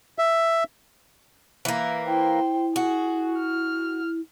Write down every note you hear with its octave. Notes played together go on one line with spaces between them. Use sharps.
E5
E3 A#3
E4 C5 G5
F#4 G#4
F6